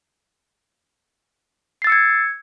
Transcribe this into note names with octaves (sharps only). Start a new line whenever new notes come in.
E6 G#6 A6 C7 C#7